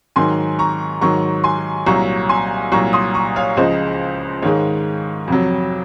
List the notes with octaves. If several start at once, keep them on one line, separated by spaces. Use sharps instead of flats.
G#2 D#3 F#3 G#5 C6
A#5 C#6
G#2 D#3 F#3 A#5 C#6
G#5 C6
C2 A#2 F#3 A#5 C#6
G#5 C6
C2 A#2 F#3 A#5 C#6
C6 D#6
A#5 C#6
C#5 F5
C#2 C#3 F3 G#3 C5 D#5
G#2 D#3 G#3 C#5 F5
F2 C3 F#3